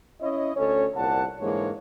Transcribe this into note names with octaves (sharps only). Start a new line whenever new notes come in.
C#4 E4 C#5 D#5
D2 C#4 A4 C#5
C2 A#2 F#5 A5
G#2 D3 E3 G#3 A#3 C#5